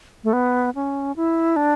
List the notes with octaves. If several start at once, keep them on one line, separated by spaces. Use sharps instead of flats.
A3
B3
C#4
E4
D4